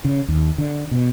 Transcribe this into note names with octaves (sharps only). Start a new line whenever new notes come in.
C#3
D#2
D3
B2